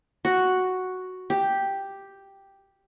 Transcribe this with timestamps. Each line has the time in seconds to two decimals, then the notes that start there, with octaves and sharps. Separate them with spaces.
0.25 F#4
1.30 G4